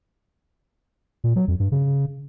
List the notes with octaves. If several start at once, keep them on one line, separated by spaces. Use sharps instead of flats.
A#2
F#3
F2
G2
C#3